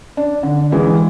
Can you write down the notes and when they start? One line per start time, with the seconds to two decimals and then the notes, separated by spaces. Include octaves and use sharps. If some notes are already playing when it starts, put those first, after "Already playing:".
0.17 D4
0.43 D3
0.72 E3 G#3